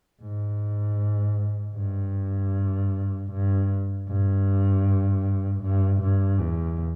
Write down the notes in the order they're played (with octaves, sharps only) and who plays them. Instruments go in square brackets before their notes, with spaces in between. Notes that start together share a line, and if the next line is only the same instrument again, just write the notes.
[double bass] G#2
G2
G2
G2
G2
G2
E2